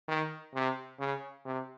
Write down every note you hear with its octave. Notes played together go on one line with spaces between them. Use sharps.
D#3
C3
C#3
C3